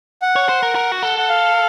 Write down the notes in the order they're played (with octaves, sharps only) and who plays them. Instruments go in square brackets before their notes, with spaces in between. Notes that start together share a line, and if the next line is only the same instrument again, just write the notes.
[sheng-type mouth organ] F#5
[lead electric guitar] C#5
C5
A#4
A#4
F#4
A4
[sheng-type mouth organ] F#5
F5